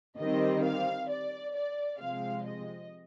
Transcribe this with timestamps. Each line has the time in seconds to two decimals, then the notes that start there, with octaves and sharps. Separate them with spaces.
0.18 D#3 G3 C4 D#5
0.64 F5
1.09 D5
1.55 D5
2.00 C3 F3 G#3 C4 F5
2.46 D#5